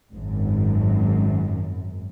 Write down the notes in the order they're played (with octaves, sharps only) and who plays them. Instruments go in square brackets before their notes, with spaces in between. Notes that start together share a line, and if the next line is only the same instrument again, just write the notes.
[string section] G#1 F#2